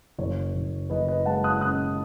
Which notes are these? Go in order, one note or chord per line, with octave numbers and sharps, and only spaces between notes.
F#1 C#5
F#1
F#1 B4 D#5
B4 D#5
G#3 F#5 A5
D#6 F#6
C#3 D#6 F#6